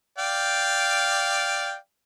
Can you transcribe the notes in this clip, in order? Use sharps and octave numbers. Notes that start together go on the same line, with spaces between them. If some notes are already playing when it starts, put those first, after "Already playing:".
D5 F5 G5